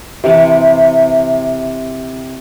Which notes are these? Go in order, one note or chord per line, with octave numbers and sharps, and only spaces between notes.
C3 E3 A5